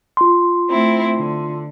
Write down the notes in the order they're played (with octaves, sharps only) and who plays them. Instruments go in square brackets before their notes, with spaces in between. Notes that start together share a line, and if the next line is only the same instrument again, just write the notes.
[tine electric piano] F4 C6
[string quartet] A3 C4 E4
D3